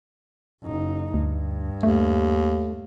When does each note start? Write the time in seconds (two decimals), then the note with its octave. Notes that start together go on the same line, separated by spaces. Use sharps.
0.63 F#1 D#4
1.14 D2 G2
1.83 D#2 A3